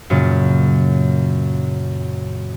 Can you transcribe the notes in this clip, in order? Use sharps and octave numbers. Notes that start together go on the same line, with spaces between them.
F#2 A#2 C#3